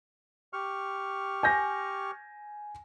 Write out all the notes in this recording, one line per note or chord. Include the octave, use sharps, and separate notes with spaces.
G4 C#6 F6
G#5 G6 A#6